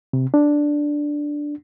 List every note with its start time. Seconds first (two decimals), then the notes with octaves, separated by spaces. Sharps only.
0.13 C3
0.34 D4